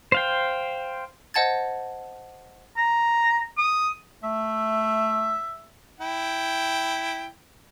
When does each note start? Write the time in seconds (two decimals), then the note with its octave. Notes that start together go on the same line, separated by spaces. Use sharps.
0.12 C5 F5 G5
1.34 C5 D#5 F#5 A5 G#6 A6
2.77 A#5
3.58 D#6
4.23 A3 E5
6.00 E4 G5